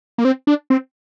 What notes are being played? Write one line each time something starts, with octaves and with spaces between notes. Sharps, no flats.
A#3
C4
D4
C4